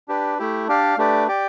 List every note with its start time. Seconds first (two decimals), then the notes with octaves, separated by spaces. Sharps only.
0.08 D4 G4 B4
0.39 A3 E4 G4
0.68 D4 G4 D5 F5
0.98 A3 D4 G4 B4 D5
1.28 G4 D5 G5